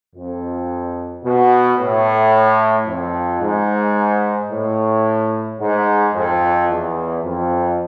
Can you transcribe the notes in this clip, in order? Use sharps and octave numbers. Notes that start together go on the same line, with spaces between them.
F2
B2
A2
F2
G#2
A2
G#2
F2
E2
F2